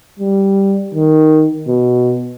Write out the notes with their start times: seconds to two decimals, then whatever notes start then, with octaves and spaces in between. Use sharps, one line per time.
0.19 G3
0.95 D#3
1.68 B2